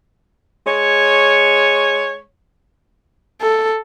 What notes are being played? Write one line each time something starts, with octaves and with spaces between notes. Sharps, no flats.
G#3 C#5
A4